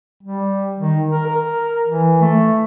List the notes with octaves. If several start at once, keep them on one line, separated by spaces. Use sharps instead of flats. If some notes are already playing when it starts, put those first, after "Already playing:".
G3
D#3
A#4
A#4
E3
A3